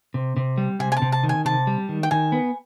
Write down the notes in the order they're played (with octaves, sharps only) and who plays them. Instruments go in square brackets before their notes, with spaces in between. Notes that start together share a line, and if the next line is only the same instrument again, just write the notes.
[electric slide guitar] C3
C3
G3
[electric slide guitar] C3 [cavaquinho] G#5
[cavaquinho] G#5
A5
[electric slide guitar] C3
[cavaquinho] A5
[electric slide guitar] D#3
[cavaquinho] G#5
[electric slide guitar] C3 [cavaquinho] A5
[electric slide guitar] G3
D#3
[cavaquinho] G5
[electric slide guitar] D#3 [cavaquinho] G#5
[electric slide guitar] B3